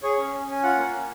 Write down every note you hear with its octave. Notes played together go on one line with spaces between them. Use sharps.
G#4 C#5
C#4
C#4
C#4 G#5
F4 F#5
A#3
C#4